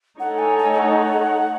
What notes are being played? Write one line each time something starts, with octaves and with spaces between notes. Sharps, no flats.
A3 D#4 A4 C#5 F#5
G#5
G#5
G#5
F#5